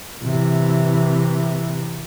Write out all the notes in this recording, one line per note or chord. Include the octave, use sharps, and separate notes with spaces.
C3 E3